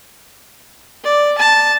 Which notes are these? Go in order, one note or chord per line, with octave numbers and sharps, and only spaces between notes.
D5
A5